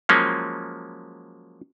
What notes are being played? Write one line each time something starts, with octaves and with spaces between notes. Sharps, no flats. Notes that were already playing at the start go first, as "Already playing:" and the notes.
F3 F#3 G#3 A#3 C#4